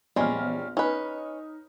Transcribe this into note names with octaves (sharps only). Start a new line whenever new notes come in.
A#1 E2 G3 G#3 C#4 F6
C#4 D#4 B4